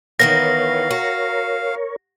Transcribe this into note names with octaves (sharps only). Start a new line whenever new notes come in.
D#3 E3 B3 A#4 C#5 F5 A#6
F#4